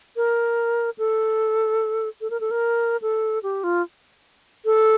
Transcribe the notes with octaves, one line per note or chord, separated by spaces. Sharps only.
A#4
A4
A4
A#4
A4
A#4
A4
G4
F4
A4